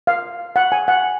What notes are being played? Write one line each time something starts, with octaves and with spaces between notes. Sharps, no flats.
F5
F#5
G#5
F#5